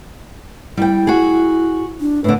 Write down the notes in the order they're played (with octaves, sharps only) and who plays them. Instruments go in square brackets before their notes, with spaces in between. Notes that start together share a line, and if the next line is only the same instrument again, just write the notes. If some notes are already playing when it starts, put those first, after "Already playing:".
[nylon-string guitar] G3 G5 [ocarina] E4
[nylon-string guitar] F#4 G#4
[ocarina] D4
[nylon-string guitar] A2 D3 [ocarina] B4